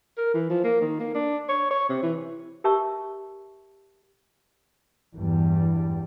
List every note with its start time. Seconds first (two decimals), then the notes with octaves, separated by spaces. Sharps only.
0.18 A#4
0.34 E3
0.50 F3
0.64 A#3
0.81 D#3
1.00 A#3
1.15 D4
1.49 C#5
1.71 C#5
1.89 C3
2.03 E3
2.64 G4 A#4 E5 A5 C#6
5.16 E2 G2 G3